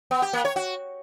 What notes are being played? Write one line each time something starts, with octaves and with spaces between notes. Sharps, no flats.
B3
G4
A#3
C#5
F#4